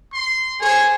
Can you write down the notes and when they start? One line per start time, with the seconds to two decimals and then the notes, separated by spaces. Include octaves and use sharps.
0.13 C6
0.60 G#4 C5 C#5